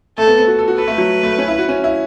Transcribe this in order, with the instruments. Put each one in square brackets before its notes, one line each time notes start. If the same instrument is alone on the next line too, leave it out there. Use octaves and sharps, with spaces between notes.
[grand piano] A3 [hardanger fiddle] A4
[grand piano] B3
B3
F#4
A4
F#4
[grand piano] A4 [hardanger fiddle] B4
[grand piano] A3
F#3
A3
C#4
E4
F#4
C#4
E4